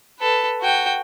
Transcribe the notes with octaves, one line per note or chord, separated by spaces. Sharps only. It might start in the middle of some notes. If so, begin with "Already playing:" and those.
A4 B4
F#4 G5